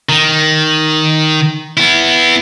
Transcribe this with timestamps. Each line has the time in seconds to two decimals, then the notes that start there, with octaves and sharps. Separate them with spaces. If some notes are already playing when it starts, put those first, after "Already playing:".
0.09 D#3
1.77 B3 E4